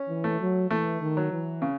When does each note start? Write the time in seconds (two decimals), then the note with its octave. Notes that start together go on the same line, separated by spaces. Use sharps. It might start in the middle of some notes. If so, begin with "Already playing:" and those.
Already playing: C#4
0.09 E3
0.24 A3
0.40 F#3
0.70 E3 A3
1.01 D#3
1.17 F#3
1.32 E3
1.62 C#3